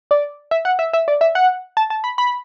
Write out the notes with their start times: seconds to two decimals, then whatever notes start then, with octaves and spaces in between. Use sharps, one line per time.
0.11 D5
0.51 E5
0.65 F#5
0.79 E5
0.93 E5
1.08 D5
1.21 E5
1.35 F#5
1.77 A5
1.90 A5
2.04 B5
2.18 B5